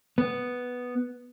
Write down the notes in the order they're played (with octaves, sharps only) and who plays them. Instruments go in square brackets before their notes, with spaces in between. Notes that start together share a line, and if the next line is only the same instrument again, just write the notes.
[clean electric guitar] B3